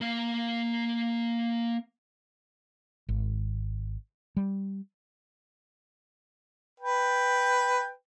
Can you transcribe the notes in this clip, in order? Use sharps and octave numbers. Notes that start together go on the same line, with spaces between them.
A#3 F5
G#1
G3
B4 G5